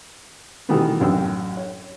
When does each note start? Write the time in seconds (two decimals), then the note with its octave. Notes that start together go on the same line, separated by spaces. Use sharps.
0.69 B2 D#3 E3 G3 A3 B3
1.00 A1 F#2 G5 E6
1.57 C#5